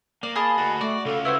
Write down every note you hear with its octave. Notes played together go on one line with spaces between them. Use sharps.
A#3 D5
G#4 D#5 A5 B5
D2 F#4
A3 F#4 D5
C#3 F4 A4
E4 F#4 B4 C5